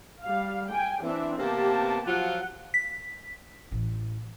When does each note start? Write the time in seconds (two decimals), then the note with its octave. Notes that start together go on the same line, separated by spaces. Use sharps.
0.23 G3 F5
0.69 G5 G#5
1.03 E3 C4 D4 E5
1.39 C3 A#3 B3 G4 A5
2.07 F3 F#3 F4 F#5
2.74 B6
3.72 A1